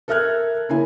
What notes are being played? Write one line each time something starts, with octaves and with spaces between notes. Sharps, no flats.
A4 A#4 E5 F6 F#6 G#6
C#3 A#3 E4 G#5